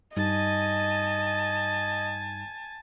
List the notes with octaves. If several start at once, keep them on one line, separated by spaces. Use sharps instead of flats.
G2 G3 D#4 D#5 G#5 A5